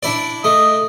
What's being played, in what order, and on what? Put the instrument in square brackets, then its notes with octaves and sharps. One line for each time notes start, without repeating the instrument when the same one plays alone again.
[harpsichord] D4 E4 D5
[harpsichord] A3 [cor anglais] D#5